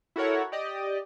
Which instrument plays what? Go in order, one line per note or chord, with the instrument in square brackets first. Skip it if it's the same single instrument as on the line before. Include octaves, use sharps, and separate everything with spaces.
[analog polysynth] E4 F#4 A4 A#4 C#5 F#5
G4 D5 D#5